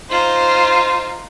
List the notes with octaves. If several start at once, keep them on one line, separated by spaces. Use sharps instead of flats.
D#4 F4 C5